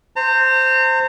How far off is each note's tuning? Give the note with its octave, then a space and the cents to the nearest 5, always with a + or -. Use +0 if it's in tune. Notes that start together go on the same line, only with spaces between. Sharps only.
C5 -5 A#5 -40